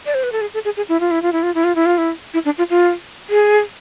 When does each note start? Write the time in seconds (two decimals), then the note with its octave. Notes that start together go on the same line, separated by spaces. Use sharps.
0.06 D5
0.14 C5
0.23 B4
0.32 A4
0.41 G#4
0.54 A4
0.65 G#4
0.77 G#4
0.89 E4
1.00 F4
1.11 E4
1.22 F4
1.33 E4
1.43 F4
1.55 E4
1.64 F4
1.76 E4
1.86 F4
1.98 E4
2.34 E4
2.45 D4
2.58 F4
2.70 F4
3.30 G#4